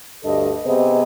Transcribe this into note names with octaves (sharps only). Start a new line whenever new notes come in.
D2 G2 A4 D#5
C3 B3 G#4 C5 D#5